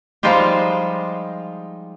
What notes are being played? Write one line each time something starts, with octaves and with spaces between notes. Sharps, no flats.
F3 G3 G#3 D#4 F4 G4